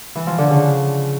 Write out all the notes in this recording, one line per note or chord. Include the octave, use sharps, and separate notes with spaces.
E3
F3
D3
C#3